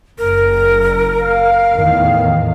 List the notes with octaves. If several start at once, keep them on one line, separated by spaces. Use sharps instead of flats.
F#1 A#4
F5
E2 A2 D#3